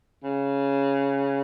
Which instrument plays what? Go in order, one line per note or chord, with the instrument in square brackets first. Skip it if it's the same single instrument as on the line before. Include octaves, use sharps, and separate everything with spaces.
[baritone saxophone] C#3